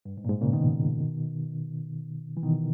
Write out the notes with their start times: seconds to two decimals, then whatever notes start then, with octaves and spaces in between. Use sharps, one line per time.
0.05 G2
0.17 G#2
0.25 A#2
0.29 G#2
0.41 A#2 C#3
0.53 B2 D#3
2.37 E3
2.43 B2 D#3